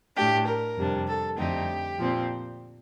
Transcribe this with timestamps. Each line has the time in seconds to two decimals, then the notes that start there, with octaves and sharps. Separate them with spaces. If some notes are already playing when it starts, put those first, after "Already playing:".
0.16 A2 A3 D4 G4
0.46 A#4
0.76 F2 C3 G3 D4
1.07 A4
1.37 F2 D3 A3 C4 D#4 G4
1.99 A#2 F3 C4